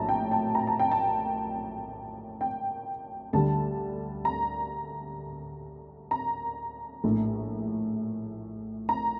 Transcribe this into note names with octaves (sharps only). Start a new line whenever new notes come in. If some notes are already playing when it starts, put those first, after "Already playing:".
Already playing: A#1 A2 F#3 A3 A5 A#5
G5
A5
A#5
A5
G5
A5
G5
D2 D3 G3 A5
A#5
A#5
A#1 A2 A3
A#5